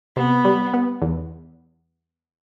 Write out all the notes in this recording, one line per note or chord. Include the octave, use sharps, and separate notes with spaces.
C3 B3
G3
B3
E2